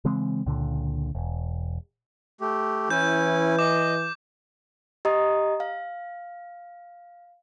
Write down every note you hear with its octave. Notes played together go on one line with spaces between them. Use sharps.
C#3 E3 G#3 C4
C#2 A#2 D3
E1
A3 G4
E3 C#4 E4 G#5 G6
D#5 D6
G4 D#5 A#5 D#6
F5